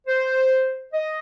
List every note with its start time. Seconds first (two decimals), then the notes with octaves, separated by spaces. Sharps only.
0.07 C5
0.94 D#5